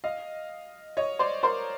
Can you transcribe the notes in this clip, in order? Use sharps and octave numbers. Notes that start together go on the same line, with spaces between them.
D#5 F5
C#5 D#5
C5 D5
A#4 C5